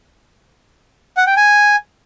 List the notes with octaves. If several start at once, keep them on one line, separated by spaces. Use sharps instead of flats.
F#5
G5
G#5